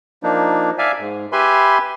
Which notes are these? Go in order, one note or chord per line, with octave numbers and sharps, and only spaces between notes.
F3 A#3 D4 D#4
D5 E5 F5 G#5
G#2
G4 B4 E5 G#5 B5 C6